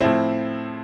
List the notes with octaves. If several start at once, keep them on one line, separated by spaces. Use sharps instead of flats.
A2 F3 C4 E4